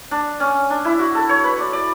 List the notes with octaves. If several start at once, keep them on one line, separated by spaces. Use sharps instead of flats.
D4
C#4
D4
E4
F#4
A4
C#5
B4
D5
D5